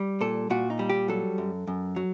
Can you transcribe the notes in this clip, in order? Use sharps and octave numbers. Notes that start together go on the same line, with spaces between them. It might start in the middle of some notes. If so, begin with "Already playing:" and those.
Already playing: G3
A#2 A4
A#2 F#4
D#4
G3
G4
F#3 A4
F#2
F#2
F#3